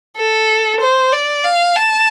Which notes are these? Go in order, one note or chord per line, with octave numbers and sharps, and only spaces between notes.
A4
C5
D5
F5
A5